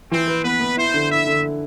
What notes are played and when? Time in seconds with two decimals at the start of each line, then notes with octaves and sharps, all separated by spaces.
0.11 E3 C4
0.28 B4
0.44 B3 B4
0.61 B3
0.77 E4 C5
0.94 D3
1.11 E4 E5
1.27 D3